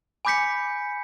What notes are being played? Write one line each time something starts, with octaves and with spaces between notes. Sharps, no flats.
G#5 B5 D6 G6 B6 C#7